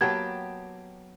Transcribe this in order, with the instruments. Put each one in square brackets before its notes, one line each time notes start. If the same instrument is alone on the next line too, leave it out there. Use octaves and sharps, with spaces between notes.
[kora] F#3 B3 [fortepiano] A#3 G4 A5 [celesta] G#6